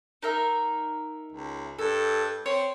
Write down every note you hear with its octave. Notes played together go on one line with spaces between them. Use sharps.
D#4 A#4 E5
C#2
G2 A4
C4 C#5